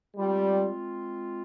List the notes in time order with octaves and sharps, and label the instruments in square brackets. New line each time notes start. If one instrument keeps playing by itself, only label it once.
[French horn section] G3 [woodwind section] G#3 C4 F4